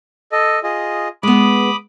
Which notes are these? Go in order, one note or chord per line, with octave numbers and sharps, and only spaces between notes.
A4 D#5
F4 G#4 D#5
G#3 B3 B5 D6 D#6